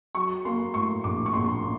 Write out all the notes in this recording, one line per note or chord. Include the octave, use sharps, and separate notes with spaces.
F#3 C#6
A#3 C6
A2 C#6
A#1 D6
C#6
A#1 C6
C#6
C6
A#3